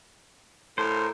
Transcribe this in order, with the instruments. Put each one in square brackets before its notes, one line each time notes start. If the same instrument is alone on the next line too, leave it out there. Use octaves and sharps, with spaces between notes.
[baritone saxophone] A2 [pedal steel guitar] A#4 C5